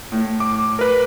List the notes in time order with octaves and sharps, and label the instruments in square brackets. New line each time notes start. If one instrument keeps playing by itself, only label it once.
[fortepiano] A2
[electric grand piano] D6
A#4 B4